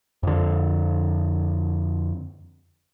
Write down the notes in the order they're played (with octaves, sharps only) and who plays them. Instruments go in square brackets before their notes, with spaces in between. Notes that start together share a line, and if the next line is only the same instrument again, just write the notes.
[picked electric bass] F2 D3